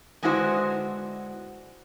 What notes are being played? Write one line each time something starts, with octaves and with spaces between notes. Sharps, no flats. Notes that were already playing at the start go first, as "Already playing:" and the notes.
D3 G#3 B3 E4 F#4 C5